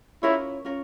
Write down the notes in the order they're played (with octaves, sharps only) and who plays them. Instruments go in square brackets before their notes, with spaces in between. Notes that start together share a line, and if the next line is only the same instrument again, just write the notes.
[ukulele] C#4 F4 A#4 C#5 [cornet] E4
[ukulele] C#4 F4 A#4 C#5